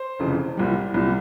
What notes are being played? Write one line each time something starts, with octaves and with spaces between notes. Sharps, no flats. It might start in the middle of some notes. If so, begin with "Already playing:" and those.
Already playing: C5
F1 F2 C#3 E3
C2 A#2 G3
C2 A#2 G3